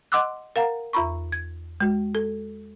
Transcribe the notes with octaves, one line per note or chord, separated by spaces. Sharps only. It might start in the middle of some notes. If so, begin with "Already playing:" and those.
D#5 F#5 C6 D6 E6 F#6
A#4 F5 F#5 A#5
E2 F4 A#5 B5 C#6
G#6
G#3 F#4
A4